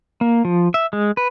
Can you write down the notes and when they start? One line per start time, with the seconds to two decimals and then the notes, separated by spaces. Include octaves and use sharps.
0.21 A#3
0.45 F3
0.74 E5
0.93 G#3
1.17 B4